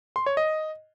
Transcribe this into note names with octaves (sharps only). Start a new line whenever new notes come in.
C6
C#5
D#5